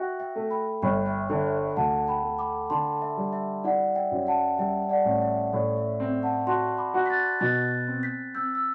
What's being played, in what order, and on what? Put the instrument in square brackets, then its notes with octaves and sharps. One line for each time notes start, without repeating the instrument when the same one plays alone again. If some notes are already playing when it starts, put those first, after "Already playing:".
Already playing: [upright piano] F#4 [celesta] E5 G5
[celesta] E5 G5
[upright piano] A3
[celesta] G5 B5
[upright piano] G1 [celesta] G5 B5
[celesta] E5 G5
[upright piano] D3 [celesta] E5 G5
[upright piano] D2 [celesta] F#5 A5
[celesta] G5 B5
[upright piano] A3
[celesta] B5 D6
[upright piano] D3 [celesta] A5 C6
[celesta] E5
[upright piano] G3
[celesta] E5
[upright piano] E4 [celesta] D5 F#5
[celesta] E5 G5
[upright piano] F#2
[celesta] F#5 A5
[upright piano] G3 [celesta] E5 G5
[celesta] D5 F#5
[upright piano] A1
[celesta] E5
[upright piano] A2 [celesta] D5
[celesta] E5
[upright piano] C4 [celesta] E5
[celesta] F#5 A5
[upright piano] F#4 [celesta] A5 C6
[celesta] B5 D6
[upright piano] F#4
[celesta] B6
F#6 A6
[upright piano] B2 [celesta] F#6 A6
[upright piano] C4
[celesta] G6 B6
[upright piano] C4 [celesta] E6 G6
[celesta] E6